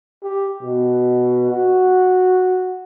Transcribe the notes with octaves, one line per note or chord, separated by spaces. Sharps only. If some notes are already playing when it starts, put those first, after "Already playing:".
G4
B2
F#4